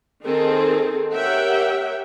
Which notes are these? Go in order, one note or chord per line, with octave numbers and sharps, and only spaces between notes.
D#3 C4 G#4 A4
G4 A#4 C#5 E5 F#5 G5